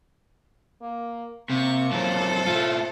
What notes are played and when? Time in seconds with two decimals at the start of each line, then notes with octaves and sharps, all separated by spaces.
0.82 A#3
1.50 C3 A#3 C#6
1.91 F#2 E3 A4 C5
2.46 A2 A3 F4